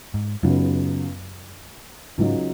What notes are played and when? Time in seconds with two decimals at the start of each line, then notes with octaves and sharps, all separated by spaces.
0.14 G#2
0.43 C#2 F#2 C#3 F#3 B3 D#4
2.18 C#2 G#2 C#3 F#3 D#4